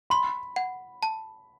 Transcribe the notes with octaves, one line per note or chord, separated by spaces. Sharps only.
B5 C6
F#5
A5